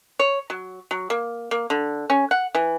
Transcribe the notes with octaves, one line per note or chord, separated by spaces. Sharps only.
C#5
F#3
F#3
A#3
A#3
D3
C#4
F#5
E3